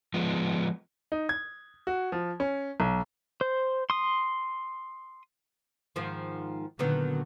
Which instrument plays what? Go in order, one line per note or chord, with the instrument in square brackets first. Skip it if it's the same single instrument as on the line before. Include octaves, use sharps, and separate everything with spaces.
[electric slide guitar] F3 G#3 B3
[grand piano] D#4
G#6
F#4
F3
C#4
B1
[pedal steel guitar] C5
C6 D#6
[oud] G#2 D#3 F3
[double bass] A#2 D3 [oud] D#3 F#3 B3